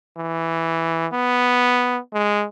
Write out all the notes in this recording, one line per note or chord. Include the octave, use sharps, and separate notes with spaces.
E3
B3
G#3